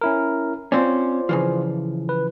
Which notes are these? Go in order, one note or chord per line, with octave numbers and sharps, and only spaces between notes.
C#4 E4 A#4
C4 C#4 F4 C5 D5
C#3 E3 F3
B4